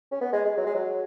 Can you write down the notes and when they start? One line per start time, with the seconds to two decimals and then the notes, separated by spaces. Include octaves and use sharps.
0.11 C#4
0.21 B3
0.33 G#3
0.45 G#3
0.57 F#3
0.66 G#3
0.74 F#3